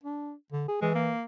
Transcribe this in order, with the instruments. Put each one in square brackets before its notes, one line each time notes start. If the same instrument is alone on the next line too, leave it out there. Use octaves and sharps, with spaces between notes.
[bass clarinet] D4
D3
G#4
[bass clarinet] E3 [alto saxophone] G#3
[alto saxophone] A#3